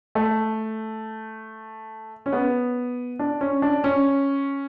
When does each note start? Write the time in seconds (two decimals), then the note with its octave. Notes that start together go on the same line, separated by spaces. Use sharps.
0.15 A3
2.26 C#4
2.32 B3
3.19 D4
3.41 C#4
3.62 D4
3.84 C#4